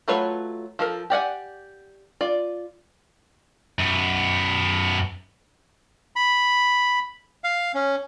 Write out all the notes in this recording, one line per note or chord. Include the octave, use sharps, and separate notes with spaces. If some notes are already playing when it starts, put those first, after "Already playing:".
F#3 A3 F4 B4 C#5
F3 A4 A#4
G4 D5 F#5 G#5
F4 D5
F#2 B3
B5
F5
C#4